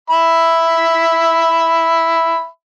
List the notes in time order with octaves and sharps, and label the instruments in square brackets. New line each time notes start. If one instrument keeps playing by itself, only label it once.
[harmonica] E5 B5